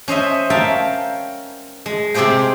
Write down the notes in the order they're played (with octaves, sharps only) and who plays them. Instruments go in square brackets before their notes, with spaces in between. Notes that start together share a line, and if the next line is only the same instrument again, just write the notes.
[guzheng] C#4 C5 D#5 E5
A#4 C#5 E5 F5 G5 A5
G#3
C3 C4 G4 G#4 C5 G5